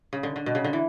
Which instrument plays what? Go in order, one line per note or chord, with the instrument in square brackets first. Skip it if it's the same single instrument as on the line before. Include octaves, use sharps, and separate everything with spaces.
[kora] C#3
D3
D3
B2
C#3
D3
E3